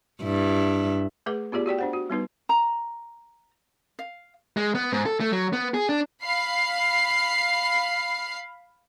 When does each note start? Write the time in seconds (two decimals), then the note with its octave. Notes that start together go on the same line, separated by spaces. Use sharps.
0.23 G2 E4
1.26 A3 G#4 B4 D6
1.52 B3 F4 G4 G#4 D5
1.66 F#4 G4 D5 G5
1.79 D4 C5 F#5
1.93 F#4
2.10 G3 B3 D#4 B4
2.49 A#5
3.99 F5
4.57 G#3
4.75 B3
4.93 G#2
5.06 A4
5.20 A3
5.32 F#3
5.53 B3
5.74 G#4
5.89 D4
6.22 F5 B5 C7